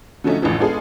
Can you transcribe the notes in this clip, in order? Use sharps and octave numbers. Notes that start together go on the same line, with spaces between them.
D3 F3 F#3 A3 C#4 D#4
A1 F2 D3 E3 F3
G#3 B3 D4 F4 G#4 A4